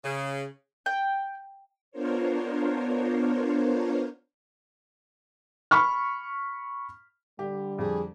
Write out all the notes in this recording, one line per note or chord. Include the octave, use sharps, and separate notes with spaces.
C#3
G5
B3 D4 F4 A#4 C5 C#5
B5 C#6 F6
D3 G3 G4
F2 G#4